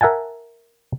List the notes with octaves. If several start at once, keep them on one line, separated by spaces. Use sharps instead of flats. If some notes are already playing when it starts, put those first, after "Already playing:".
A#4 E5 F#5 G#5 A5